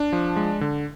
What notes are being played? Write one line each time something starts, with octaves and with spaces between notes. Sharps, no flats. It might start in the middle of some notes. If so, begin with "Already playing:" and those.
Already playing: D4
F3
G#3
D3